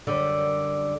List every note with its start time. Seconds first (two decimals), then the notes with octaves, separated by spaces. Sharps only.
0.07 F#2 D3 G3